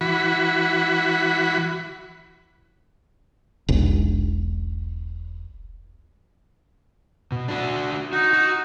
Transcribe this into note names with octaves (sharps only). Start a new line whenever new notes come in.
E3 F#4 B5
E1 B1
B2
D4 F#4
D#4 F#4
F#4